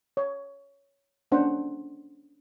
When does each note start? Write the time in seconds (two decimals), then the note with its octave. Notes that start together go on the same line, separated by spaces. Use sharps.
0.17 C#5
1.31 A#3 C#4 D4 C5 F#5